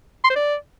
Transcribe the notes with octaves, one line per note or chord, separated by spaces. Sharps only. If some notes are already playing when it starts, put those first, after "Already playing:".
C6
C5
D5